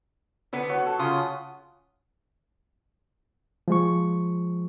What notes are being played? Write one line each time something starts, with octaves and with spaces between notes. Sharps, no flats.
D3 B3 B4
F#3 C#5
A4
C#3 F4 D#6
F3 G#3 C#6